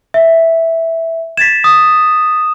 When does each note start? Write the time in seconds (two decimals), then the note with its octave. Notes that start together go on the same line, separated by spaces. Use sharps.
0.14 E5
1.37 G#6 A6 B6 E7
1.64 D#6